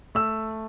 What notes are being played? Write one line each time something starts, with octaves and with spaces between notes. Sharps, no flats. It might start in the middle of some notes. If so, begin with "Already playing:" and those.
A3 E6